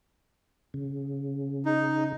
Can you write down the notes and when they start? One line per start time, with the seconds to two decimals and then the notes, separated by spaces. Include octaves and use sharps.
0.74 C#3
1.65 D#4